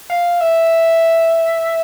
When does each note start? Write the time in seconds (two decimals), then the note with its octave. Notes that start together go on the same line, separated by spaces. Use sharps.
0.10 F5
0.40 E5